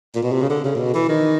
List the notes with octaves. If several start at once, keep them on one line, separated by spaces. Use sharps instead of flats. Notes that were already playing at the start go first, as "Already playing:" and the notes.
A#2
B2
C3
C#3
D3
C#3
A#2
B2
E3
D#3